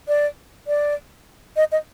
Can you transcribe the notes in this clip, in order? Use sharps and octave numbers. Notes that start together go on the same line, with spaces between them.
D5
D5
D#5
D#5